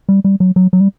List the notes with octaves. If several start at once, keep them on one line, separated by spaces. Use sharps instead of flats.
G3
G3
F#3
F#3
F#3
G3